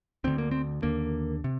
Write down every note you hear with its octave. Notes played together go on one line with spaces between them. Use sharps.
D2 D3 C4
A#3
C4
D#2 D3 A#3
C3